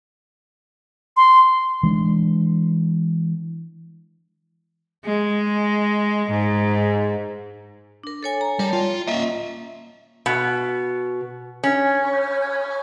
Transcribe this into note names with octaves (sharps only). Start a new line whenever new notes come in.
C6
E3 G#3 D4
G#3
G#2
D4 A#4
A4 C#5 G#5
A#5
G3 A#4 C#5 A5
F4 G5
A#3 C#4 D#5 E5
B2
C#4